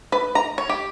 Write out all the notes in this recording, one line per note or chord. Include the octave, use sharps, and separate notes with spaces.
B4
A#5
C#5
G4